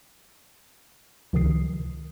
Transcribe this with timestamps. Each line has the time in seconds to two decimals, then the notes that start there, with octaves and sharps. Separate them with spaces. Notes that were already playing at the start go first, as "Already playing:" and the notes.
1.33 C#2 C3 D#3 F3 D#6 C7